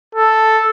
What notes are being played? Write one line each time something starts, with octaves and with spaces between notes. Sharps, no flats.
A4